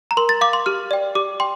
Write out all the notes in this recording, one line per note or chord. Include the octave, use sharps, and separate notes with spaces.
A#5
A#4 C6
A6
F5 D6
C6
G4 F6
D5 G5
G4 D6
G5 C6